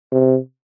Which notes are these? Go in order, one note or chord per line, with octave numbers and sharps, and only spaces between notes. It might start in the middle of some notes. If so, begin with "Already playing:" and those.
C3